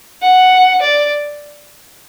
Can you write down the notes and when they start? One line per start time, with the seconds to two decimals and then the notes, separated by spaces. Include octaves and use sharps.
0.22 F#5
0.82 D5